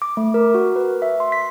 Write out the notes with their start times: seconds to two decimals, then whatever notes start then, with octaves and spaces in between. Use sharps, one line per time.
0.02 D6
0.17 A3
0.34 A#4
0.55 F#4
0.76 B4
1.02 E5
1.20 C6
1.32 B6